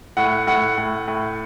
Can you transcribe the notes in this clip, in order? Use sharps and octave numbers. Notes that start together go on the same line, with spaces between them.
A2 F#5
A2 F#5
A2
A2